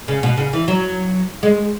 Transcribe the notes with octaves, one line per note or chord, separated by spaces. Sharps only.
C#3
B2
C#3
E3
F#3
G#3